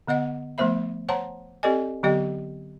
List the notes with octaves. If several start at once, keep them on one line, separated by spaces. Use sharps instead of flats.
D3 B3 D#5 F#5
F3 A3 B3 C5 E5 B5
C5 C#5 F#5 A5 A#5 C6
C4 G4 A4 D5 D#5 G#5
D3 F#3 B3 G4 D#5 G5